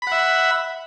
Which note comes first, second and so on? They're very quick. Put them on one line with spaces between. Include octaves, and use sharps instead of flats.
B5 F#5 E5